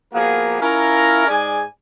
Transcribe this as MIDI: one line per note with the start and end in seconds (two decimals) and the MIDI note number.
0.13 0.58 53
0.13 0.58 58
0.13 0.58 59
0.13 0.58 66
0.13 0.58 68
0.13 0.58 70
0.60 1.25 61
0.60 1.25 64
0.60 1.25 65
0.60 1.25 70
1.28 1.63 44
1.28 1.63 68
1.28 1.63 74
1.28 1.63 80